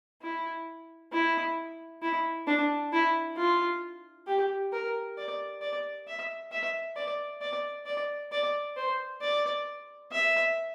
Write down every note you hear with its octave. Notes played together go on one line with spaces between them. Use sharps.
E4
E4
E4
D4
E4
F4
G4
A#4
D5
D5
E5
E5
D5
D5
D5
D5
C5
D5
E5